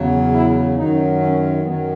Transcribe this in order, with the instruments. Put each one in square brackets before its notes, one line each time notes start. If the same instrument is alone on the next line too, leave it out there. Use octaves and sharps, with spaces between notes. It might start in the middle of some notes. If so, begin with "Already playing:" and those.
Already playing: [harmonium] E2 C#3 F#3
E4
F#2 D#3 F#3 D#4
C#4
F#2 D#3 F#3 B3